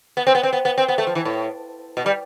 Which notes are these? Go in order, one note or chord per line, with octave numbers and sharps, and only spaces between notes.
B3
C4
B3
C4
B3
B3
C4
B3
A3
F3
E3
A2
B2
G3